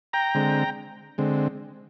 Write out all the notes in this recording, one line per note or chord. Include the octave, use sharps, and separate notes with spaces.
G5 A#5
D3 G#3 C4
D3 G#3 C4